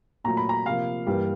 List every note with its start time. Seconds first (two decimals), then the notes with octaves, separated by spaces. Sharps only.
0.24 A#2 F#3 A3 A#5
0.37 B5
0.49 A#5
0.65 C3 F3 A#3 F5
1.07 G2 E3 G3 A#3